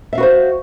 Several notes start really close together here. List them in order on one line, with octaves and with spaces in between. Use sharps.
E5 F5 F#4 B4 C5